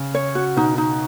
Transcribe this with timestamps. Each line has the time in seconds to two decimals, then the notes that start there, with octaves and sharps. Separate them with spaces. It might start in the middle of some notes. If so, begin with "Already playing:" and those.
Already playing: C#3
0.14 C#5
0.35 F#4
0.57 B2 D#4
0.78 D#4